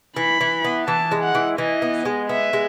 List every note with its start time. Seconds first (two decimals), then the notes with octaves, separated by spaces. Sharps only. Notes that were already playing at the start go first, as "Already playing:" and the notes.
0.17 E3 B5
0.41 E3
0.65 B3
0.88 E3 A5
1.12 G#3
1.24 F#5
1.35 E3
1.58 E3 D#5
1.82 B3
2.05 G#3
2.29 B3 E5
2.53 G#3